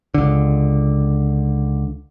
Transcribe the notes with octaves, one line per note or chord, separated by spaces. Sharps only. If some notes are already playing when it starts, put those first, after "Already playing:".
C#2 D3